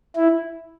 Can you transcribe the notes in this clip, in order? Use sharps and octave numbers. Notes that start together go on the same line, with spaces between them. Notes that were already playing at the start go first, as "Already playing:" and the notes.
E4